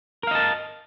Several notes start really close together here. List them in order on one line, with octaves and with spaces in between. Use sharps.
A#4 F5 D#5 A5